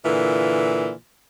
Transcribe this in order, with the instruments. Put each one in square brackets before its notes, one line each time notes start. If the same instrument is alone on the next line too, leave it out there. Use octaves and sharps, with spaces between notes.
[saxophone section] A#2 D3 E3 F4